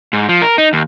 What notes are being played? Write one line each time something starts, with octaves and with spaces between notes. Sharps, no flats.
G#2
F3
A#4
D#4
D#2